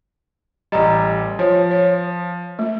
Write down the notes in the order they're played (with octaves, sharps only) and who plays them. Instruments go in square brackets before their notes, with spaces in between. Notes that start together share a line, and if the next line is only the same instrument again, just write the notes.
[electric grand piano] A1 G3 [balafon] D#5 A#5
[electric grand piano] F3 [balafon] C#5
[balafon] C#5
A3